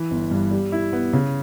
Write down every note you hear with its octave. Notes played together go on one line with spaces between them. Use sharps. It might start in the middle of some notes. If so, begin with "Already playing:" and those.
Already playing: E3
G1
G2
G3
E4
B3
C#3